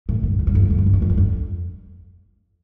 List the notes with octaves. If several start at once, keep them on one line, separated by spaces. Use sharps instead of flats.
A2
G2
F2
G2
F2
G2
F2
G2
F2
G2
F2
G2
F2